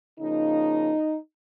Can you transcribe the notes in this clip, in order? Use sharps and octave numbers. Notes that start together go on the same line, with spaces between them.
C#3 F3 A#3 D#4